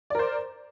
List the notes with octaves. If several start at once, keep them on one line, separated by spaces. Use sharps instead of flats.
A#4 C5 D5